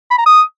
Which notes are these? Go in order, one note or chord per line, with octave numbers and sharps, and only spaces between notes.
B5
A#5
D#6